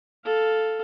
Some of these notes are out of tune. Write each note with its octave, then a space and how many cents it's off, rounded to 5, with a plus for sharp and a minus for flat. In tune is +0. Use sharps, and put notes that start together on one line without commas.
A4 +0 F5 +0